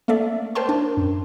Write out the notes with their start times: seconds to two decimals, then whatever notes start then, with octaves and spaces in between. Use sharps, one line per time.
0.08 A3 A#3 A4 D5 E5
0.55 A#4 C5 C#5 G5 A5 C6
0.69 D4
0.97 F#2